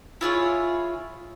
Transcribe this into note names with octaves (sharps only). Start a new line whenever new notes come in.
E4 F4 G#4 C#5